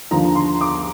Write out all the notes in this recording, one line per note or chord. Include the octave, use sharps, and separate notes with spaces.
D#2 D3 F3 A#5
C6
D6